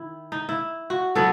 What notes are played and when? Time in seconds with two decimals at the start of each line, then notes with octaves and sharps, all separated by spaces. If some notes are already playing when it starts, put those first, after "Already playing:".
Already playing: D#3 E4
0.32 D#4
0.49 E4
0.90 F#4
1.15 F#3 B3 A4